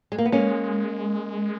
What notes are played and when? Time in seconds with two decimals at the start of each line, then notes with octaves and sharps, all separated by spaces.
0.12 G#3
0.18 A#3
0.26 B3
0.32 G#3 A#3 C#4